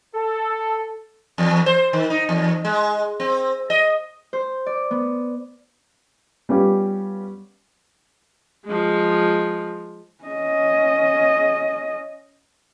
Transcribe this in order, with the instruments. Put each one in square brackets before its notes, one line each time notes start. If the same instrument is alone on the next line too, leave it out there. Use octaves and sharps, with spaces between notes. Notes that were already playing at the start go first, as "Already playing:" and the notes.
[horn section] A4
[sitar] E2
C5
D#3
D#4
E2
G#3
C4
D#5
[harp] C5
D5
B3
[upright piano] G3 B3 C#4 F4 G4
[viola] F3 G#3
[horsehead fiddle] C#4 D#5